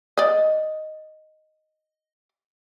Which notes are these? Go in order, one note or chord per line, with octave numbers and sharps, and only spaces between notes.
D5 D#5